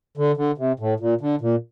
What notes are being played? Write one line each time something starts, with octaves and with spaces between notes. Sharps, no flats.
D3
D3
C3
A2
A#2
D3
A#2